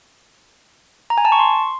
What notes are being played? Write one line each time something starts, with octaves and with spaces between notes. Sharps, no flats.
A#5
G#5
A5
C#6
C6